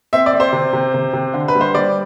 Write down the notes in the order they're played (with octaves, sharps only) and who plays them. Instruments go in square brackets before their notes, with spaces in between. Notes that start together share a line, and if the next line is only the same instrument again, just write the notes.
[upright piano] C4 E5
D5
C4
C5
C3
C3
C3
C3
D3
B4
G3
C5
G3 D5